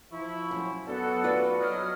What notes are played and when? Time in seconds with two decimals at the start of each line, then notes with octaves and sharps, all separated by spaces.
0.11 F3 E4 C#6
0.51 F#2
0.86 B3 D4 F#4 A4
1.24 F4 B4 D5
1.59 F#3 D#5 D#6 F6